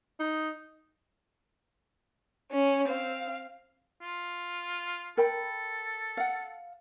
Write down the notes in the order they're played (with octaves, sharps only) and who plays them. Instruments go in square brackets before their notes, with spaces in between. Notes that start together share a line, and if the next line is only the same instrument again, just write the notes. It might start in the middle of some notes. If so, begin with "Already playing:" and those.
[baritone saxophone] D#4
[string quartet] C#4
C4 F5
[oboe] F4
[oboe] A4 [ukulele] A#4 G5 B5
[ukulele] F5 F#5